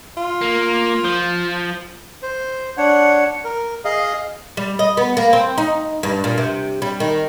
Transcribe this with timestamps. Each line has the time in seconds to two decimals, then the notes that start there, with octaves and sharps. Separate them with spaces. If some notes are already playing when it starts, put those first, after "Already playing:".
0.17 F4
0.41 A#3
1.05 F3
2.23 C5
2.77 D4 C#5 F#5
3.45 A#4
3.85 G#4 D#5 F5
4.57 G3
4.79 D#5
4.97 B3
5.17 A#3
5.33 C4
5.58 D#4
6.03 G2
6.24 A#2
6.38 C3
6.82 G3
7.00 D#3